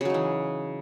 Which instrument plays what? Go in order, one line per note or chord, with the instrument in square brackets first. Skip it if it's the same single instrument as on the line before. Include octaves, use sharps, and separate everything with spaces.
[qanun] C#3
F#3
D#4
E3